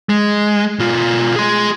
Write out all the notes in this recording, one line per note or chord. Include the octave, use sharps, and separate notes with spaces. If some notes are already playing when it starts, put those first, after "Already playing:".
G#3
B2 F4
G#4 C6